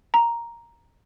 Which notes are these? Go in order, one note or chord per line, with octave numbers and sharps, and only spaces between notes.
A#5